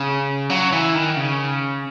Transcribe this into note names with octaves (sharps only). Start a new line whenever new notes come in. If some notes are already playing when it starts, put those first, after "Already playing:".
Already playing: C#3
F#3
E3
D#3
C#3